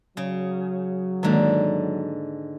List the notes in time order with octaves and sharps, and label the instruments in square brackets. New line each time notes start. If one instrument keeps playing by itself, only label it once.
[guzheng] C#3 [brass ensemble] F#3
[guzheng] G#2 D3 [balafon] D#3 G#3 A#3